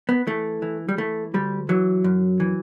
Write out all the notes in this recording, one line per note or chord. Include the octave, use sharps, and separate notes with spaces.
B3
E3 A3
E3
G3
E3 A3
D2 G3
E3 F#3
F#2
E3